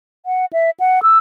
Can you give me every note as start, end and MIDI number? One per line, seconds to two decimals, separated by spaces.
0.26 0.45 78
0.53 0.70 76
0.80 1.02 78
1.03 1.18 88